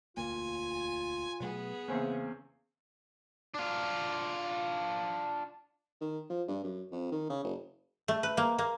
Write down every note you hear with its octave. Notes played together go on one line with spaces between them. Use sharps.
E1 D2 A#3 F4 G#5
B2 F#3 A3 B3 G#4
E2 C#3 A#3 C4 C#4
D4 F4
D#3
F3
G2
F#2
F2
D#3
C#3
F#1
A3
B4
A#3
A#3